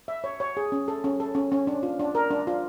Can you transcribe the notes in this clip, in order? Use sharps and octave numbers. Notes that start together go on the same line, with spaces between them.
E5
C#5
C#5
G#4
C#4
A4
C#4
A4
C#4
C#4
D4
F4
D4
A#4
D4
F4